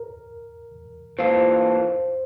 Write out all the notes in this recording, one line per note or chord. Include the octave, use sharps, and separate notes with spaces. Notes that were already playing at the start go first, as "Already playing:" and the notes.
Already playing: A#4
E3 A#3 F4 A4 C5